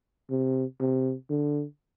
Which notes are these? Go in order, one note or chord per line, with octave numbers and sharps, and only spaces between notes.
C3
C3
D3